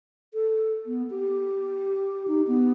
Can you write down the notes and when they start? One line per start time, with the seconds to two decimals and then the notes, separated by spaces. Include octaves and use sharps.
0.34 A4
0.86 B3
1.10 G4
2.28 D#4
2.47 B3